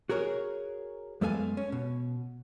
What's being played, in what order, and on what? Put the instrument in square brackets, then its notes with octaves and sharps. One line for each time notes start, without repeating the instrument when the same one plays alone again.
[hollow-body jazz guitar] F#4 G#4 A#4 C#5
F#2 G#3 B3 A4 F5 G#5
C#4
B2